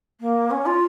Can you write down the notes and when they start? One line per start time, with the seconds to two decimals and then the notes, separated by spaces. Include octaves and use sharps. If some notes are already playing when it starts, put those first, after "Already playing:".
0.21 A#3
0.51 C#4
0.66 F4